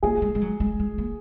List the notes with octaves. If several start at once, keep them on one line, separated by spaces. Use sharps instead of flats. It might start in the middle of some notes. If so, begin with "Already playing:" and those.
A#3 G#4
G#3
G#3
F#3
G#3
G#3
A#3